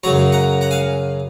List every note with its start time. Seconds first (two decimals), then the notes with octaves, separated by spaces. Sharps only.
0.04 F#2 C#3 F#3 A#5 C#6
0.32 F#5 A#5
0.61 F#5 A#5
0.71 F5 G#5